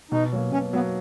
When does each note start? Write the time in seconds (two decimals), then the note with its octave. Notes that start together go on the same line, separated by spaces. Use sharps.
0.11 B2 D#4
0.32 F#3 A#3
0.52 B2 C#4
0.73 F#3 A#3 B3